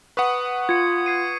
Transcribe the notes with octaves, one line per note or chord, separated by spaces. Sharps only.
B4 F#5 C#6 D#6
F4 G#6 C#7
G#6 C7 D#7